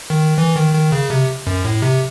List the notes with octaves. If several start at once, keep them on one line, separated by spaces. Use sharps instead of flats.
D#3
E3
D#3
D#3
C#3
C3
F#2
A2
C3